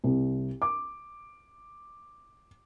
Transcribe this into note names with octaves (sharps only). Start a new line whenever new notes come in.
C2
D6